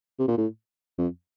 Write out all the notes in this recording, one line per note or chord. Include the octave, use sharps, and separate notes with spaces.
C3
A#2
A2
F2